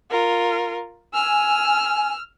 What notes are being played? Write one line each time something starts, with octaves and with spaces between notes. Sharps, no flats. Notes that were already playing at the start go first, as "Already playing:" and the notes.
F4 A#4
G#5 E6 F6